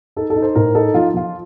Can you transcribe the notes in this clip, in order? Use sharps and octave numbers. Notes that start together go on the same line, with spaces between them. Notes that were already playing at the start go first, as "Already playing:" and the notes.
D#4 A4
A4
D#4
C5
A2 A#4
D#4 A4
F3 F4
F3 F4